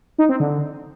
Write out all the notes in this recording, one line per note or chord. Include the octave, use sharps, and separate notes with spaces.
D#4
C4
D3